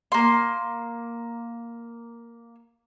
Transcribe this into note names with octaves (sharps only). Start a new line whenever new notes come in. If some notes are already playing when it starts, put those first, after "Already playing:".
A#3 C6